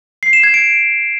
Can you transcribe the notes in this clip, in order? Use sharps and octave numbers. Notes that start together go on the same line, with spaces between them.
C7
E7
G#6
D7